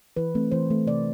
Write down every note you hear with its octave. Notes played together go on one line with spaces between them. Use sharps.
E3 B4
A3 C4
E3 C5
A3 C4
C3 D5